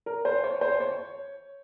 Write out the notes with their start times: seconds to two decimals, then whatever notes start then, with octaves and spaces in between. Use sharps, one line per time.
0.06 A#4
0.25 C5
0.44 C#5
0.61 C5
0.80 C#5